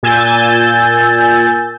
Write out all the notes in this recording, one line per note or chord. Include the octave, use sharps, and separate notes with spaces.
A#2 G#5 E6 G6 A6